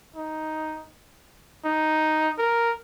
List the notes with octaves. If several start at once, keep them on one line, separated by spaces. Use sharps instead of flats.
D#4
D#4
A#4